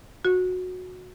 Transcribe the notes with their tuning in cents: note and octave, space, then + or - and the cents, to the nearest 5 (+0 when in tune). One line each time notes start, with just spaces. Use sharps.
F#4 -15